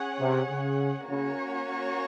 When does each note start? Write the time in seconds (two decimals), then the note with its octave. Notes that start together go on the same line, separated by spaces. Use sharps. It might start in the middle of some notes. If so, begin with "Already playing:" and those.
Already playing: C#4 G#4 C#5 F#5
0.20 C3
0.51 C#3
1.10 C#3 A#3 C#4 F#4 C#5